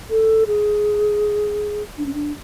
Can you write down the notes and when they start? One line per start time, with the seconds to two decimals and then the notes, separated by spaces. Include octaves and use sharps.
0.10 A4
0.47 G#4
1.98 D4
2.06 C#4
2.14 D4